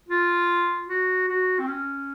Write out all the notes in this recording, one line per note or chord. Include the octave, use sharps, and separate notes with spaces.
F4
F#4
F#4
C4
C#4